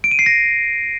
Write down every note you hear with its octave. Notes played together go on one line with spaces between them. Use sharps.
D7
D#7
C7
A#6